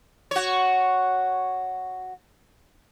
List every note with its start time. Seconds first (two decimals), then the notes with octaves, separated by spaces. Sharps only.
0.31 F#4 C#5